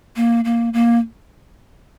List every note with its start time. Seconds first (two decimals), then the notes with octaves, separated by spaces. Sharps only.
0.16 A#3
0.45 A#3
0.73 A#3